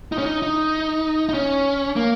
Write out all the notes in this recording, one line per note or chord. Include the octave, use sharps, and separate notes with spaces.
D#4
C#4
D#4
D#4
D#4
C#4
A#3